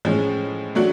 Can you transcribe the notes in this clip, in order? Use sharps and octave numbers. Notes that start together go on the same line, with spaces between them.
A2 F3 G#3 C#4
F#3 A3 D4 F#4